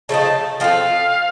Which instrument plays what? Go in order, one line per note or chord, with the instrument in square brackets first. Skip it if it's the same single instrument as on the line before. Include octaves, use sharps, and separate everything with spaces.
[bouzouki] C#3 F3 A3 D#4 [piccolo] A5
[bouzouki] F3 C4 F4 A4 [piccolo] F5